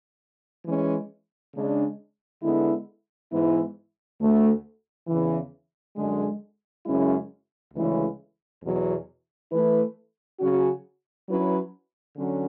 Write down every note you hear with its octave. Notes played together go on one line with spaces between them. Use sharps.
E3 G#3 C#4
C#3 G#3 D4
D3 G#3 B3 E4
G#2 E3 B3 E4
D2 D3 A3
E2 C#3 E3
F#2 D3 G#3
F#2 C#3 G#3 C#4 E4
D2 C#3 E3 G#3 C#4
E2 B2 F#3
E3 A3 E4 B4
C#3 F#3 C#4 F#4
F#3 C#4 E4 B4
D3 F#3 C#4